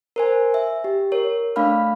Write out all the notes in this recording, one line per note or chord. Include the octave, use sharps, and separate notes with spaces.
A#4 C5 G#5
E5
G4
A#4 C#5
A3 D4 F5 B5 F6